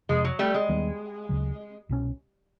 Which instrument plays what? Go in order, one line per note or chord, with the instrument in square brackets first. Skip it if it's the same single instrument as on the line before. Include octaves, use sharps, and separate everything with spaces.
[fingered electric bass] F2 C3 F3 [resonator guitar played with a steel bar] G#3
[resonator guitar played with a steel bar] F#3
G3 A3
G#3
[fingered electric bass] D#2 D#3 G3 B3
D2 C#3 F#3
C2 B2 G#3 C#4